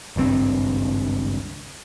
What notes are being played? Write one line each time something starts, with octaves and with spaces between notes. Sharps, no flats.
G#1 C#2 G2 C4